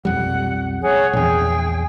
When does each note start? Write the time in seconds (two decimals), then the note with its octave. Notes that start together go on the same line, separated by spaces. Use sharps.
0.05 B1 F2 G3 F#5
0.82 G#4 C#5 F#5
1.13 A#1 E2 G#4 G5